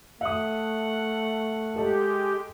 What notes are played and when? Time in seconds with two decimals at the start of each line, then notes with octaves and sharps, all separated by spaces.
0.21 A3 E5 F#5 D#6
1.76 G#3 G4 A4 D#5 A5